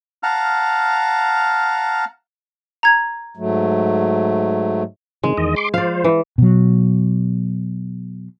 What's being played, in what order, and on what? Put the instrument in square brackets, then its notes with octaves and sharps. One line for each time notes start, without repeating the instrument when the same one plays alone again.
[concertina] F5 F#5 A5 A#5 F6
[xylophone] A#5 G#6
[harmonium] G#2 F#3 A3
[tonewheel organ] C3 D#3 [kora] G#3
[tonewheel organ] E2 D#3 D#5
C6 D6
[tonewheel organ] F3 C5 [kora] D5 F5
[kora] E3
[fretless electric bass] B2 F#3